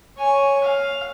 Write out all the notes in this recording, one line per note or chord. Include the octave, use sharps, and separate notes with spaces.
C#5 G#5
F5